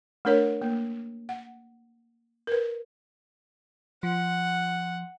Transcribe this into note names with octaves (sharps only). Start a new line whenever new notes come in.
A3 D4 A#4 C#5
A#3
F#5
A#4 B4
F3 F#5